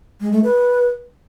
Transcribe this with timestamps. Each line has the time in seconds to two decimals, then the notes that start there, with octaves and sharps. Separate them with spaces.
0.21 G#3
0.32 A3
0.44 B4